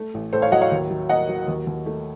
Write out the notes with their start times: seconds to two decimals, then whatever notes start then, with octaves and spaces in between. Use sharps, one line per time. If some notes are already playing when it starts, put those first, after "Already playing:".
Already playing: A3
0.14 A1
0.33 A2 A4 C5
0.42 C#5 F5
0.52 F#3 D#5 F#5
0.61 C#5 F5
0.71 D#2
0.90 F#3
1.09 A#3 D#5 F#5
1.29 F#3
1.48 D#2
1.67 D#2
1.86 A3